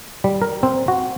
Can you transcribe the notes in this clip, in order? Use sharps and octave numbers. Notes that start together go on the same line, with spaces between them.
G3
A#4
C4
F#4